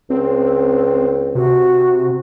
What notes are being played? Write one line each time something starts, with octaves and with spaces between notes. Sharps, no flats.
C#2 C4
C3 F#4